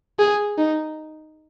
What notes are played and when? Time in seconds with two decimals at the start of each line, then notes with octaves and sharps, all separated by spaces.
0.19 G#4
0.58 D#4